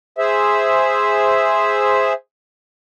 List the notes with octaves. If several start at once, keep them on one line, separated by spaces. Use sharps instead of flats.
G#4 C5 E5